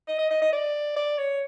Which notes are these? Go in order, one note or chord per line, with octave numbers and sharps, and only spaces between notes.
D#5
D#5
D#5
D#5
D5
D5
C#5